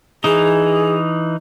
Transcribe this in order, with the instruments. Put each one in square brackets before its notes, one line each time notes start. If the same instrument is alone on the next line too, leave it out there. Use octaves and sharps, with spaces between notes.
[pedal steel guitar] E3 D#4 [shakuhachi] G#4